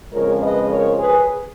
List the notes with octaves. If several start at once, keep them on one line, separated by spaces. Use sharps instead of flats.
F2 C#3 F3 G#3 A#4 C#5
B4 D#5
A#4 C#5
G#4 B4